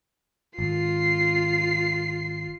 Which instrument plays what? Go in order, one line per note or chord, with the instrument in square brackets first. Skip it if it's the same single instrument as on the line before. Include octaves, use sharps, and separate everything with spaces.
[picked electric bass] G#1 [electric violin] F4 C7